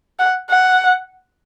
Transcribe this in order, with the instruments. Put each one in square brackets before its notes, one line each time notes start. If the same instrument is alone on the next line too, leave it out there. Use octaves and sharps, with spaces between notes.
[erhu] F#5
F#5